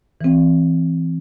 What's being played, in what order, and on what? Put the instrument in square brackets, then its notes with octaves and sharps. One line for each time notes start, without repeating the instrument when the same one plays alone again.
[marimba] E3 C4